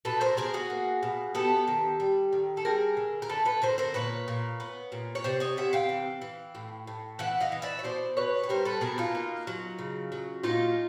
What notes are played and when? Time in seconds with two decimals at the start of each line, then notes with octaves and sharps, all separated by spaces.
0.05 B2 A4 B4
0.21 A#4 C5
0.37 B2 G#4 A#4
0.54 F#4 G#4
0.70 A#3
1.03 B2
1.35 B3 G4 A4
1.68 D#3
2.00 G3
2.33 D#3
2.57 A4
2.65 G3 G#4 A#4
2.97 D3
3.22 A#4
3.30 D3 A4 B4
3.45 A4 B4
3.62 D3 A#4 C5
3.78 A#4 C5
3.94 A#2 B4 C#5
4.28 A#2
4.60 B3
4.92 A#2
5.15 C#5
5.24 C3 C5 D5
5.40 C#5 D#5
5.57 C3 E5 F#5
5.73 F5 G5
5.89 E3
6.22 E3
6.55 A2
6.87 A2
7.19 E3 E5 F#5
7.40 D#5 F5
7.52 E3
7.62 D5 E5
7.79 C#5
7.83 B2 C5 D5
8.17 B2 B4 C#5
8.43 C#5
8.49 G3 A#4 C5
8.65 A4 B4
8.81 B2 G#4 A#4
8.98 D#4 F4
9.15 A#3
9.47 F#3
9.79 C#3
10.12 F#3
10.44 A#2 D#4 F4